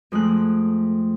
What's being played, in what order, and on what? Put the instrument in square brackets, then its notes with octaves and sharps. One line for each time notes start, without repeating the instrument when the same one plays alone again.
[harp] F2 G#3 A3 F#6